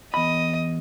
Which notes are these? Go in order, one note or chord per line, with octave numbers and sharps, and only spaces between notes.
E2 D#5 B5